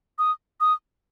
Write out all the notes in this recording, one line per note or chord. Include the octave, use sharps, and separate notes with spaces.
D#6
D#6